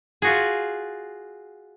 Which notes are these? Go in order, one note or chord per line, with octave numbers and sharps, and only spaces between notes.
F4 F#4 G#4